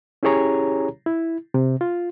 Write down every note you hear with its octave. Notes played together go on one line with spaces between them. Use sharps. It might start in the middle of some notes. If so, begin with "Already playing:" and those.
C#4 E4 G4 G#4 C#5 A#5
E4
C3
F4